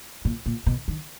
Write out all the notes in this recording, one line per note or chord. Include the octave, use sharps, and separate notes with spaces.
A#2
A#2
B2
D#3